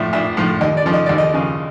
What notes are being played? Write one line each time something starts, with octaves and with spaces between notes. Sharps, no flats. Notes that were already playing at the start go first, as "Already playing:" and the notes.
Already playing: A#1 A2 F3 E5
A#1 E5
A2 F3
D#2 D#5
D5
C#3 F3
D#5
D#2 D5
D#5
C#3 F3